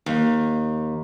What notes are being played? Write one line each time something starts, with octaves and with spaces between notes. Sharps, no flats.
D#2